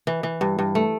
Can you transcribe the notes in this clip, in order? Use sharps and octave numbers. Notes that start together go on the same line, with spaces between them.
E3
E3
G2
G2
A3